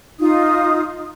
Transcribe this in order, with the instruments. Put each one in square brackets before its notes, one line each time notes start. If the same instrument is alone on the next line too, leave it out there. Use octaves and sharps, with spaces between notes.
[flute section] D#4 F4 D#6